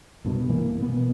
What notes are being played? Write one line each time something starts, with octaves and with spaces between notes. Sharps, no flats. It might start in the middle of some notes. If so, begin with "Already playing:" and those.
C2 G2 B2
C2 E3 A#3
B2 B3